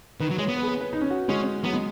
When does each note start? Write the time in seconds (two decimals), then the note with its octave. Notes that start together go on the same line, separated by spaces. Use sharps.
0.20 D#3 B4
0.30 F#3
0.38 G#3 C#5
0.48 B3
0.57 B4
0.63 G#4
0.68 B4
0.81 B4
0.93 D#4
1.01 C#4
1.11 F#4
1.29 G#3 C#4
1.64 F#3 B3
1.73 G#3